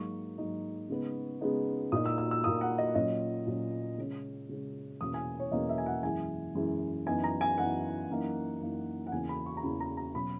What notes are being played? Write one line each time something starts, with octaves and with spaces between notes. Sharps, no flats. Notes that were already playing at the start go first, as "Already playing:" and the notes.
Already playing: G#2 F#3 A#3 D#4 C#6
G#2 F#3 A#3 D#4
C#3 G#3 B3 D#4
C#3 G#3 B3 D#4
A#2 A#3 D#4 D#6
E6
E6
E6
A#2 A#3 D#4 D#6
F#5
D#5
A#2 F#3 C#4 D#5
A#2 F#3 C#4
C#3 G#3 C#4
C#3 G#3 C#4
E2 B2 A#3 C#4 D#6
G#5
C#5
E2 B2 A#3 C#4 D#5
E5
G#5
F#5
F#2 E3 G#3 G#5
F#2 E3 G#3
F#2 E3 B3 D#4 G#5
A#5
G#5
F#2 E3 B3 D#4 F#5
F#2 E3 A#3 D#4
F#2 E3 A#3 D#4
F#5
E2 C#3 E3 A#3 C#4 G#5
B5
C#6
A#5
E2 C#3 E3 A#3 C#4 B5
A#5
A#5
B2 F#3 C#4 B5